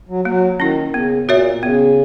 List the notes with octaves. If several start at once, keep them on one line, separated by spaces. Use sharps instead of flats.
F#3
F#3 A#3
D#3 C#4 E4
C#3 B3
G#2
A#2 F#4 A#4 C#5 E5
C#3 B3